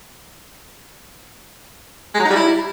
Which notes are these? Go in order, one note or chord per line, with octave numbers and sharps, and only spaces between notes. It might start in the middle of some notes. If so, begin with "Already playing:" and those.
G#3
F#3
D#4
G3
E4